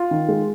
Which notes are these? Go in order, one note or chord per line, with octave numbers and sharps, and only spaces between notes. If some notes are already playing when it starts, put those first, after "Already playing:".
Already playing: F4
D#3
G#3